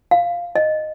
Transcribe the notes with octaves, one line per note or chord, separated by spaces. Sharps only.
F5
D#5